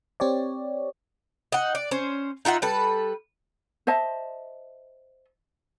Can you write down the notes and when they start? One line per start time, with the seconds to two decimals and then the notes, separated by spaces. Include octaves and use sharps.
0.20 C4 G4 C#5 D5
1.52 D#4 F#5
1.75 D5
1.91 C#4 C5
2.45 D#4 F4 E5 F#5
2.62 G3 A4 B4
3.87 C5 D#5 E5 A5